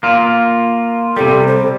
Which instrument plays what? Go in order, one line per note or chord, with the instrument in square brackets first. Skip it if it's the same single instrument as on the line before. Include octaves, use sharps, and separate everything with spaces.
[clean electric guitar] A#3 F4
[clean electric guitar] C3 G3 [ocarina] A4
[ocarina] C5